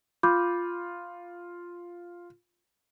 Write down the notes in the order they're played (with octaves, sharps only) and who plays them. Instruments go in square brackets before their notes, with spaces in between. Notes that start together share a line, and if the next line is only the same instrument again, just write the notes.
[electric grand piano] F4 [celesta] B5 D6 G6